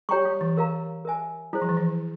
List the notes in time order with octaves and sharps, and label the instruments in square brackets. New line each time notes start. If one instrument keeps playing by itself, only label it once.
[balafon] G3 [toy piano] G4 C#5 G5 A#5 C#6
[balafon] G3
E3
[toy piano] A#4 F5 A#5
A#4 E5 G#5
[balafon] G3 [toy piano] E4 G#4 C5
[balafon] F3
E3
F3